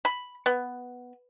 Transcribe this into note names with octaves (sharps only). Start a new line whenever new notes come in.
B5
B3